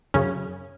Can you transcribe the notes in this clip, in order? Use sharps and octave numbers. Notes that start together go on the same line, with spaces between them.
F#2 C#3 C#4